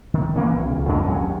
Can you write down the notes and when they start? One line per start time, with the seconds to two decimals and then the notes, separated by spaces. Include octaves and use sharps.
0.14 D#3
0.36 E3 A#3 B3 C#4
0.52 B1
0.71 C#2
0.89 F2 G#3 D4
1.06 D#2 D#3 F#3 C#4